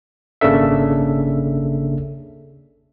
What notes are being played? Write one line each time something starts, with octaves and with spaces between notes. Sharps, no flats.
G#1 C#3 A#3 D4 A4 E5